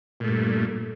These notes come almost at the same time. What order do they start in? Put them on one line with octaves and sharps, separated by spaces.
A#2 A3 G2